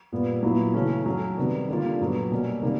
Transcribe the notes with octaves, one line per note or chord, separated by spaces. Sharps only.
A#2 G3 B3
A#2 F#3 B3 E4
C#3 E3 A3 C#4
F#3 A3 C#4
C3 D#3 G3 B3
D3 G3 A#3 D4 F4
A#2 F#3 B3
B2 G3 A#3 C#4
C3 D#3 G3 A#3